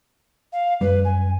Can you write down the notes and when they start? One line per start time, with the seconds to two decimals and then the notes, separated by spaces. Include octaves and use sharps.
0.53 F5
0.81 F#2 G3 B4
1.05 G#5